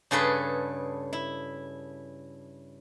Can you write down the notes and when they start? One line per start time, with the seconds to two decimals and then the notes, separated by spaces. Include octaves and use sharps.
0.11 G2 C#3 G#4 A4 B4 C6
1.13 E4